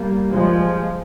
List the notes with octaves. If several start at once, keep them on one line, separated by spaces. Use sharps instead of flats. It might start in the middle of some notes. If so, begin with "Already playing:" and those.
Already playing: G3 A#3
F3 G#3